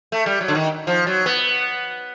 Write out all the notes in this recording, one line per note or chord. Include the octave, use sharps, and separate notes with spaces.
A3
G3
F#3
D3
D#3
F3
F#3
B3